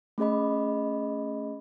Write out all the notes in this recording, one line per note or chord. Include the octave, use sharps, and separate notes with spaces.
A3 C#4 G#4 D#5 B5